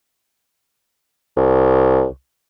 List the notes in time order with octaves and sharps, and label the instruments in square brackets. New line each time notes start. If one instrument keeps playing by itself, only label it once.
[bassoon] C2